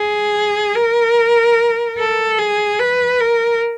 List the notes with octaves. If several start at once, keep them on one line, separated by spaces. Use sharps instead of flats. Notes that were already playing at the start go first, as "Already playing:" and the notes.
Already playing: G#4
A#4
A4
G#4
B4
A#4